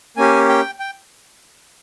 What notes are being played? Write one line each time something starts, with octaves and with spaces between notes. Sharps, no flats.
A#3 C#4 G4 G#5
G5
G5